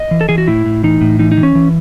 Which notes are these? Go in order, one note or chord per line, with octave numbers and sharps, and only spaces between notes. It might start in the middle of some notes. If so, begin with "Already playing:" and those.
Already playing: D#5
E3
A4
E3 G#4
F#4
A2 E4
A2
E3 D#4
A2
E3 D#4
D#4
E3
C#4
E3